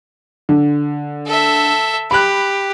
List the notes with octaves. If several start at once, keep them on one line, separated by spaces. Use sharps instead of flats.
D3
A4 E5
G4 B5 F#6